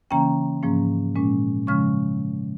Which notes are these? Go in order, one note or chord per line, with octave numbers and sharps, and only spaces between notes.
C#3 E3 A#3 C#4 G5 A#5
G#2 F3 A#3 C#4
A#2 G#3 C#4
C#3 F3 G#3 C#4 C#6 F6